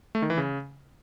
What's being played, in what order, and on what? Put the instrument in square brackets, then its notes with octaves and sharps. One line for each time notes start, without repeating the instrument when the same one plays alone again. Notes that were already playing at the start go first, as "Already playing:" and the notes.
[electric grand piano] A3
D#3
E3
C#3